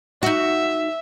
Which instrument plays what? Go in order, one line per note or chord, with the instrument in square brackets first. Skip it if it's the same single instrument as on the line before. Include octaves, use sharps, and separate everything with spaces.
[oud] D#4 F#4 [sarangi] E5